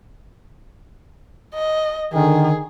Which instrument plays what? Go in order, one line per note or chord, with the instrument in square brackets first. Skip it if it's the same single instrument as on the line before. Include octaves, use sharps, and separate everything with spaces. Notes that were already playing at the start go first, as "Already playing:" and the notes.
[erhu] D#5
[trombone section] D3 D#3 [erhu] G#4